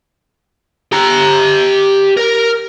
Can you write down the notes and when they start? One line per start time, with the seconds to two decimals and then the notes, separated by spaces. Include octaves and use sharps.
0.92 G4 A#5
2.17 A#4